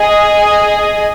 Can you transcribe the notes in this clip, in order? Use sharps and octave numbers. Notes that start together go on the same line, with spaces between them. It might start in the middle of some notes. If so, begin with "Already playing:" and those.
Already playing: G#4 D#5 G#5